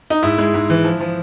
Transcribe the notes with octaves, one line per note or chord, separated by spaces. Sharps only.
D#4
G#2 E4
G#3
G#2
E3
F3
F3